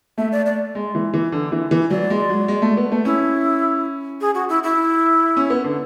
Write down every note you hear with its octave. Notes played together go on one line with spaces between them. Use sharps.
A3 E5
D5
D5
G#3
E3
E3
D3
E3
E3
F#3 D5
G#3
F#3
G#3
A3
B3
A3
C#4 E4
G#4
F#4
E4
E4
C#4
B3
D3